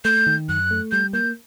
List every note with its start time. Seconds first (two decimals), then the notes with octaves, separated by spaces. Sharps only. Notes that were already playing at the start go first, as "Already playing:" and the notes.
0.05 A3 G6
0.27 D#3
0.49 F#2 F#6
0.71 A3
0.91 G3 G6
1.13 A#3 G6